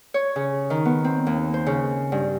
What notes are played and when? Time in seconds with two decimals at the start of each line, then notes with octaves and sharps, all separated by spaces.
0.14 C#5
0.36 C#3
0.70 D#3
0.85 B3
1.04 C4
1.27 D#2
1.54 C5
1.66 C#3
2.12 G2